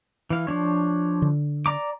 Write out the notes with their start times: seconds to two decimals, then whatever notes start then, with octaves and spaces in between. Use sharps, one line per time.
0.30 E3 F5
0.47 F3 D4 C#5
1.22 D3
1.66 D5 A#5 D6